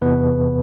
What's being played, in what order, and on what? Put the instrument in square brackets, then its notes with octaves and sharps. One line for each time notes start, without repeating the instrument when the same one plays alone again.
[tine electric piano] E2 C3 E3 B3 B4